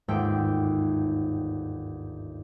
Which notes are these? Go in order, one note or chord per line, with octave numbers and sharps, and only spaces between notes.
G1 D#2 G#2 E5 G5 D7